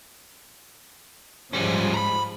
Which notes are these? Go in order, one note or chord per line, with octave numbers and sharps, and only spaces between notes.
G#2 F3 G3 G#3 C#4
A#5 B5